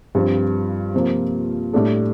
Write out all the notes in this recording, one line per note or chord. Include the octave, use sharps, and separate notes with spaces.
G2 F3 C4
C3 F3 A#3
A2 G3 D4 A4